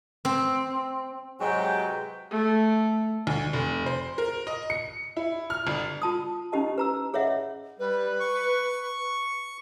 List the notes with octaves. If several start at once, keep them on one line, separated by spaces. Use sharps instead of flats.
C4
G#2 C3 F#3 G#3 B4 G5
A3
D2
F1
C5
A#4
D#5
C#7
E4
F6
G1
F4 A5 D#6
C#4 D#4 E4 G4 D#5 A5
B4 A#5 E6
G#4 C#5 D#5 E5 F#5
G3 B4
C#6